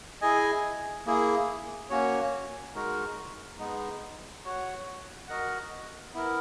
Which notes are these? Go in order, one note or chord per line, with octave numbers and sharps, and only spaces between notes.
E4 G#4 D#5 G#5
A#3 E4 G#4
A#3 C#4 F#4 C#5
G#3 D#4 F#4 A#4
G#3 B3 D#4
F#4 C#5 F#5
F#4 A#4 D#5 F#5
B3 E4 A#4